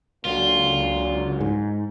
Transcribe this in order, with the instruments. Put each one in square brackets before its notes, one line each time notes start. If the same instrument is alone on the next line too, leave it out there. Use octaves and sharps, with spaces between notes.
[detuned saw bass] C#2 [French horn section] A#2 D3 F#3 [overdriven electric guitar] F4
[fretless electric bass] G#2